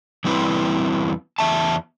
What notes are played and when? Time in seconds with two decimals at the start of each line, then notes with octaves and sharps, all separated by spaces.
0.24 E2 G3 C4 E4 B4
1.39 E2 E5 A5